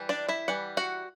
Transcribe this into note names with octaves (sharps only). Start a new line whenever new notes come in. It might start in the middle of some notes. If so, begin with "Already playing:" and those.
Already playing: E3 G3
D4 D5
E4 E5
E3 G3 F#5
F#4 F#5